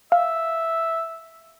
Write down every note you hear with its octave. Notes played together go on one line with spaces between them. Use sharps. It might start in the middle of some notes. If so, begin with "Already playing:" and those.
E5 F5